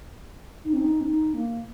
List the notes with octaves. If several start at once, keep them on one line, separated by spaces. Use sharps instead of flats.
D#4
C4
D#4
C4
D#4
A#3